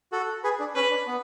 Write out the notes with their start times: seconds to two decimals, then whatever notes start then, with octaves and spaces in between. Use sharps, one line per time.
0.12 F#4 A4
0.44 G#4 B4
0.60 D4
0.75 C#4 B4
0.90 D4
1.07 B3